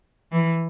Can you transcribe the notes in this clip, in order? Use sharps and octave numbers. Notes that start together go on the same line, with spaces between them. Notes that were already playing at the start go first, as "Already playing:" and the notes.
E3